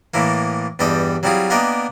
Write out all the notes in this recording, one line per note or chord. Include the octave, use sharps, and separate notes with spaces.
A2 E3 A3 A#3
E2 G2 G3 A4 D#5 G5
F#3 G3 C4 E4 F4 G#4
A#3 B3 D4 A#4 D#5 G5